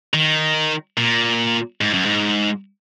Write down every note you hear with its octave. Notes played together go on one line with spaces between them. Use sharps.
D#3
A#2
G#2
F#2
G#2